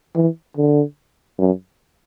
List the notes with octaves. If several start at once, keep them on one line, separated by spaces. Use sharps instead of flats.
E3
D3
F#2